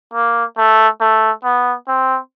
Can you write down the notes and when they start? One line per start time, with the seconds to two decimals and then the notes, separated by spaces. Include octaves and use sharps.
0.14 A#3
0.57 A3
1.01 A3
1.44 B3
1.88 C4